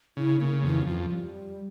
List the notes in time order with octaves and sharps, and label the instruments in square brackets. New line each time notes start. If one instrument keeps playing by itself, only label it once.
[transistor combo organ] C#3 [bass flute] E4
[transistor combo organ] C#3 [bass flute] A#3
[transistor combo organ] F2 [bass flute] E3
[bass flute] G3
[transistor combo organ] F2 [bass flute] F3
[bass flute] G3